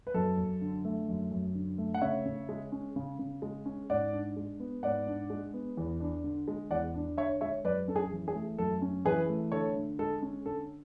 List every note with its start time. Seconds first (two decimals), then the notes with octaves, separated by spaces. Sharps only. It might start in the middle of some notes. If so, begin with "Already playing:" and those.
0.07 B4
0.14 F#2 A4
0.38 F#2
0.61 D3
0.85 A3
1.09 F#2
1.31 F#2
1.55 D3
1.78 A3
1.94 F#5
2.01 C#3 C#5 E5
2.25 C#3
2.49 G#3
2.72 C#4
2.96 C#3
3.19 C#3
3.42 G#3
3.66 C#4
3.90 G#2 D5 F#5
4.13 D4
4.36 G#3
4.60 B3
4.83 G#2 D5 F#5
5.07 D4
5.30 G#3
5.54 B3
5.77 E2
6.00 D4
6.24 D3
6.48 G#3
6.71 E2 D5 F#5
6.94 D4
7.18 D3 C#5 E5
7.41 G#3 C#5 E5
7.64 F#2 B4 D5
7.88 C#4 A4
7.96 G#4
8.12 E3
8.28 G#4
8.35 A3
8.58 F#2 A4
8.82 C#4
9.05 E3 G#4 B4
9.29 A3
9.52 D3 A4 C#5
9.76 D3
9.99 G#3 A4
10.22 C#4
10.46 D3 A4